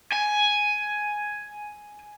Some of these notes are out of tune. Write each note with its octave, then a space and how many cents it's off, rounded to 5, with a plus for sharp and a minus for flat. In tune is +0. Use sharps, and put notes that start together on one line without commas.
G#5 +5